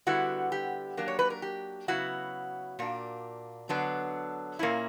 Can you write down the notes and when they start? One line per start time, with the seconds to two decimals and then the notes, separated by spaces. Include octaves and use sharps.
0.07 D3 G3 B3 E4 F#4
0.52 G4
0.97 F#3 A#3 D4
1.08 C#5
1.19 B4
1.30 A#4
1.42 G4
1.88 C#3 F#3 B3 E4 F#4
2.79 A#2 A#3 D4
3.69 D3 F#3 B3 D4
4.59 A#2 A#3 C#4 E4